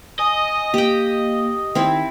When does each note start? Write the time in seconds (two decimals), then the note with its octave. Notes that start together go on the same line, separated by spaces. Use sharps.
0.19 D#5 G#5
0.74 A#3 G4 G5
1.75 D#3 C4 E4